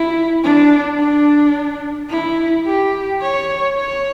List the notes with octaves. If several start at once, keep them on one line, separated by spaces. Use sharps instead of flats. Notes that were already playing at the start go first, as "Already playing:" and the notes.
Already playing: E4
D4
D4
E4
G4
C#5
C#5